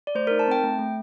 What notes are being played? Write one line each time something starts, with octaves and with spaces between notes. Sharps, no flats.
D5
A3 C5
A#4
D#4
A5
C4 G5
A3
A3